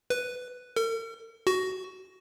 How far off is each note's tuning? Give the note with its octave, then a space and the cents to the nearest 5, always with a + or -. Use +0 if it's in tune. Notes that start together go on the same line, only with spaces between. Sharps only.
B4 +5
A#4 -45
F#4 +15